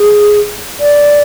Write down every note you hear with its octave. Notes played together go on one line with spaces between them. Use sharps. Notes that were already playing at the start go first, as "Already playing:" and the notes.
Already playing: G#4
D5